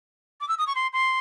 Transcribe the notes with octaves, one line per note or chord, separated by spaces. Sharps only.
D6
E6
D#6
C#6
C6
C6